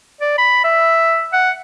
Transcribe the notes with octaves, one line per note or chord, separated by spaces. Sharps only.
D5
B5
E5
F#5